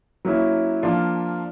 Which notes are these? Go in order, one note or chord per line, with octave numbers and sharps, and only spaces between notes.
F#3 A#3 C#4 E4
F3 A#3 D4 F4